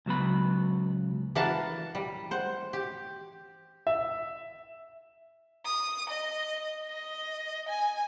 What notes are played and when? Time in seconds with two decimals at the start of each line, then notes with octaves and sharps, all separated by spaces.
0.06 C#2 F#3 B3 B5
1.35 E3 D4 A#4 F5 F#5 A5
1.95 G3
2.31 C5 F#5
2.73 G4
3.87 E5
5.65 D#6
6.09 D#5
6.84 D#5
7.68 G#5